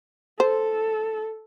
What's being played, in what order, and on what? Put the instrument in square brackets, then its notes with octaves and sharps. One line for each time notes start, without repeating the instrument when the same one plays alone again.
[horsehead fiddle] A4 [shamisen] C5